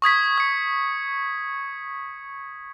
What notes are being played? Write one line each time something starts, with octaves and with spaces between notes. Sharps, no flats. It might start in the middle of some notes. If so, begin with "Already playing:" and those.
C#6 D#6 G#6 B6
D#6 C#7